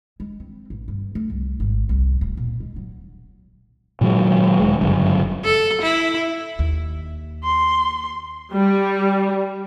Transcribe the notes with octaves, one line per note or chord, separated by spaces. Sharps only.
G#3
C4
A1
G2
A3
C2
G#1
C2
D1
A#2
G#3
F#3
A#2 D#3 F#3 G#3
E1 G#3
G1 F#2 C#3
A4
E4
D#2
C6
G3